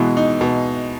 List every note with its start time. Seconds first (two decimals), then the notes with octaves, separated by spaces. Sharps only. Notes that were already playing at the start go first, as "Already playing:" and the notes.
Already playing: B2 E3 G#3
0.17 D#4
0.41 B2